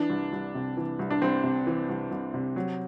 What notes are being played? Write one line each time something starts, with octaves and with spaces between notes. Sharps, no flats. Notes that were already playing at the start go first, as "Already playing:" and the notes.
Already playing: E3 D4
C2
C2
C3
E3
C2
D4
C2 C4
C3
E3
C2
C2
C3
F#3